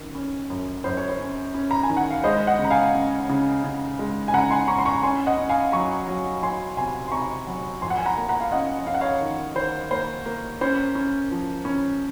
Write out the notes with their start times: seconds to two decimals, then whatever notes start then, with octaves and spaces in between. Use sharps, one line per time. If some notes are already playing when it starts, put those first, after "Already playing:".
Already playing: D#3 C#4
0.15 C#4
0.50 F#2
0.84 F#2 C5
0.97 C#5
1.09 C5
1.20 C#4
1.54 C#4
1.71 A#5
1.83 G#5
1.90 D#3
1.97 F#5
2.10 F5
2.24 G#3 C5 D#5
2.47 D#5 F#5
2.58 C#3
2.64 A#5
2.70 F5 G#5
2.94 C#4
3.29 C#3
3.64 C#3
3.99 G#3
4.28 G#5
4.33 C#3 F#5 A#5
4.51 G#5 C6
4.68 C#4 A#5 C#6
4.79 C6
4.85 A#5 C#6
5.03 C#4 G#5 C6
5.26 D#5 F#5
5.37 C#4
5.49 F5 G#5
5.72 F#3 A#5 C#6
6.08 F#3
6.42 F#3 G#5 C6
6.77 C3 G#5 C6
7.07 C6
7.12 C3 A#5 C#6
7.47 F#3
7.81 F2 G#5 C6
7.90 F#5
7.98 G#5
8.05 F#5 A#5
8.17 A#3
8.29 F#5 A#5
8.41 F5
8.51 C#4 D#5 F#5
8.86 C#4 F5
8.95 F#5
9.01 C#5 F5
9.21 D#3
9.56 D#3 C5
9.91 A#3 C5
10.26 A#3
10.61 C#4 C5
10.95 C#4
11.31 F3
11.65 C#4